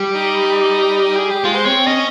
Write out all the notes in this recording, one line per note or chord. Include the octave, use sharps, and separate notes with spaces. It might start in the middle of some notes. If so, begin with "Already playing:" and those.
Already playing: G3
D#4
G#4
G4
G#3 F4
C5
C4 C#5
C#4 D#5